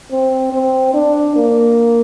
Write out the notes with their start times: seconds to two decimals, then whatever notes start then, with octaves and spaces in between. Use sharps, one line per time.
0.12 C4
0.53 C4
0.94 D4
1.36 A#3